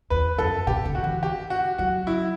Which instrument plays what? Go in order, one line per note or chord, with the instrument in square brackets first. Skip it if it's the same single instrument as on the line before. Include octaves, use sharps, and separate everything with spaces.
[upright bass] E2 [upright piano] B4
[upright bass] F#2 [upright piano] A4
[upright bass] B2 [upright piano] G4
[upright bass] D3
[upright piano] F#4
[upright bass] E3
[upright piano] G4
F#4
[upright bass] F#3 [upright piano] F#4
[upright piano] E4